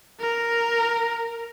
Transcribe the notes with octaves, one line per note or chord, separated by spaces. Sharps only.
A#4